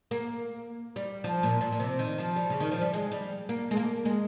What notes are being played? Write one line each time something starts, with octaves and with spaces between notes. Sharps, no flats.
A#3
G3
F3
A#2
A#2
A#2
C3
D#3
F3
G3
C#3
D#3
F3
G3
G#3
G3
A#3
G#3
A#3
G#3